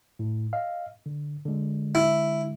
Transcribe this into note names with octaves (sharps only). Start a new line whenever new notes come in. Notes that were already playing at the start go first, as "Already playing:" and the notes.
A2
D#5 F5
D3
D3 G#3
E4